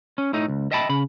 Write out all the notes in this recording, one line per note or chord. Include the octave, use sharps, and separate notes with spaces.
C#4
A2 A3 D#4
C#2
D#5 E5 G5 A5 B5
C#3 B5